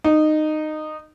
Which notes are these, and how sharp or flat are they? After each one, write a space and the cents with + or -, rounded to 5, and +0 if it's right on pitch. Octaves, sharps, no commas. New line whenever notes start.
D#4 -15